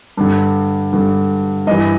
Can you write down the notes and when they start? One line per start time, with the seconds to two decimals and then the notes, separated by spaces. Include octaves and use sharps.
0.17 G2 D3
0.93 G2 D3
1.67 G2 E3 D#5